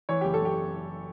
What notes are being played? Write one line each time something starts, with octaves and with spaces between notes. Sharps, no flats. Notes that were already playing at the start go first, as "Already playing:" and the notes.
E3 C#5
F#1 G4
A4
F#1 G4